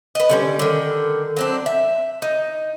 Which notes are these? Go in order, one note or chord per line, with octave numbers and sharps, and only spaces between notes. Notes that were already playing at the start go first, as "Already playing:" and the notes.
B4 D#5
D3 G3 C#4
D3 D#3
F#3 C4 D4
E5
D#4